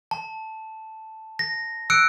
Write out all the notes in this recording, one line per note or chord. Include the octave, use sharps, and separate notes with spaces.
A5
A#6
E6 F#6 C#7 D7